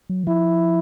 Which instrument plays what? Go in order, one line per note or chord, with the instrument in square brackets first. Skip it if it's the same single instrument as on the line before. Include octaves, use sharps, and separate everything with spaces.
[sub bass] F#3
E3
[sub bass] F3 [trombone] E4